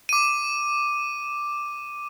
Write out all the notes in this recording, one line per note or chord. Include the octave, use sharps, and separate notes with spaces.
D6 D#7